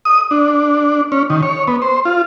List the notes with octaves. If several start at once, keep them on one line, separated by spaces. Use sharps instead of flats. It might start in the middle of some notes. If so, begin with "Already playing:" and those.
D#6
D4
C#4
D#3
C#5
B3
C5
F4